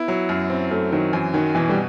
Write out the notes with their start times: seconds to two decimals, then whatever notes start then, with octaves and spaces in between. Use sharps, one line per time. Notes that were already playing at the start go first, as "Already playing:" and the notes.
Already playing: B3 E4
0.08 F#3
0.29 F#2
0.50 C4
0.71 F#2 A3
0.92 D#3 F#3
1.13 F#2 E3
1.34 D#3 F#3
1.55 B2 E3
1.69 G3